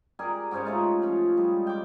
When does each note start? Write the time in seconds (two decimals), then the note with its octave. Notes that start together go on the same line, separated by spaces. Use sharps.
0.19 G4 G#4 A#4 D5
0.51 G#2 C#4 C5 C#5
0.65 A3 D#4 F4
1.02 F3 C#4
1.37 G3 G#3
1.67 G5 D6